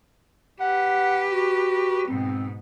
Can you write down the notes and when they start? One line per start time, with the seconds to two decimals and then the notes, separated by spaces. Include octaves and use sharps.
0.61 G4 B4 F#5
1.32 F#4
2.08 G#2 B2 C4